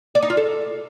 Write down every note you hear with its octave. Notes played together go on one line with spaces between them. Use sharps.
D5
D#4
F4
A4